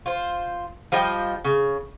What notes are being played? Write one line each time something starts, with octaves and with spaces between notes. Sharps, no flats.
F4 C5
F3 G3 D#5 G5
C#3